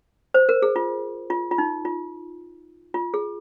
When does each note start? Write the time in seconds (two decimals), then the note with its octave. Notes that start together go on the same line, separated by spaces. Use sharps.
0.34 C5
0.49 A#4
0.62 G#4
0.76 F4
1.30 F4
1.51 F4
1.58 D#4
1.85 F4
2.94 F4
3.14 G#4